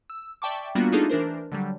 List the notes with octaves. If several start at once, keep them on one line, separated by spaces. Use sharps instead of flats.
E6
D5 E5 G5 A5 C#6 D6
G3 A#3 B3 D4 F4 F#4
A3 D4 D#4 F4 G#4 A4
E3 D4 A#4 C5
D3 F#3 G3